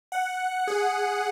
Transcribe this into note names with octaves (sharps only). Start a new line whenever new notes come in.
F#5
G#4